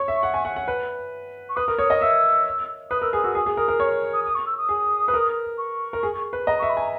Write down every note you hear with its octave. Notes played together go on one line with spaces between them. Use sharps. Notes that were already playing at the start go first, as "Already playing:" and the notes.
Already playing: C#5 C#6
E5
F#5
G#5
F#5
F#5
B4
C#6
B4 D#6
A#4
C#5 D#6
D#5
E5 E6
B4 D#6
A#4 E6
G#4 D#6
F#4 E6
G#4 D#6
G#4
A#4 D#6
A#4
C#5 C#6
D#6
D#6
C#6
E6
D#6
G#4
B4
A#4
C#6
A#4
G#4
B4
D#5 A#5
C#6
E5
B5
G#5 A#5